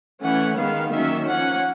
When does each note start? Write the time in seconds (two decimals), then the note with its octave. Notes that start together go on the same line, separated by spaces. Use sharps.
0.22 E3 A3 C#4 F#5
0.57 D#3 G#3 B3 F5
0.92 D#3 F#3 A#3 C#4 E5
1.28 F3 A#3 C#4 F#5